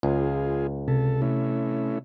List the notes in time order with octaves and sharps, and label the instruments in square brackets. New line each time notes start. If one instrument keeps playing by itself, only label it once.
[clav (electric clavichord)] C#2 [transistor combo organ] F4 G#4
[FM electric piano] C3 [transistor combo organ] A4
[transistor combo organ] A3 C#4 E4